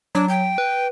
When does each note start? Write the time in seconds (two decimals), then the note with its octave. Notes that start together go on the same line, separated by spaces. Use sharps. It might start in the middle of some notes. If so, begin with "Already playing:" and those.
0.15 F#3 D4
0.29 G5
0.58 B4